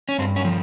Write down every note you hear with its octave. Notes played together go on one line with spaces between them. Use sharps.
C#4
G2 C4
C#4
F3